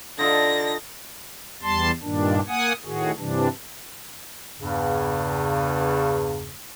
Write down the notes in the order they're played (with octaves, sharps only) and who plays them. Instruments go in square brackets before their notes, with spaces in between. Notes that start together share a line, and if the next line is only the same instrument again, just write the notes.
[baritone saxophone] D3 [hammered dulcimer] D#4 F4 A4 [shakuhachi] D5 [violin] A#6
[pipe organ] E2 G3 A5 C6
G2 A#2 D#3 D4
A#3 F#5 G#5 D#6
A2 D#3 F#4 G#4
G2 C3 E3 D4
[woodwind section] E2 G2 C#3